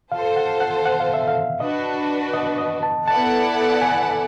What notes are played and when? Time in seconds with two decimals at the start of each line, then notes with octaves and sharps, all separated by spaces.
0.12 F4 A4 C5 F5
0.36 F#5
0.60 F#5
0.85 F#5
1.00 F5
1.14 E5
1.28 F5
1.60 D4 F#4 B4 D#5
2.33 D#5
2.58 D#5
2.83 A5
3.08 B3 E4 A4 D5 F#5 A5
3.82 G#5